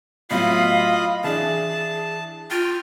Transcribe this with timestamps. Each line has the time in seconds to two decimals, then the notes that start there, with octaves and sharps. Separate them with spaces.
0.31 A2 F#3 B3 F4 D#5 F5 B5
1.24 E3 D4 G#4 A5
2.51 F4 G5 F6